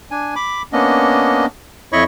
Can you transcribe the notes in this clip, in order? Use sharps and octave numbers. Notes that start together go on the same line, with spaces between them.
D4 G#5
B5 D6
A#3 B3 C#4 D4 D#5
F2 E4 C#5 D#5 B5 C#6